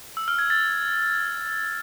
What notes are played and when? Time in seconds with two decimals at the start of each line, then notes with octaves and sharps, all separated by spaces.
0.17 E6
0.28 F6
0.39 G#6
0.50 A6